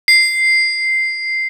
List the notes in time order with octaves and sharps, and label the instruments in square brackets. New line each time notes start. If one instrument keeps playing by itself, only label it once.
[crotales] C7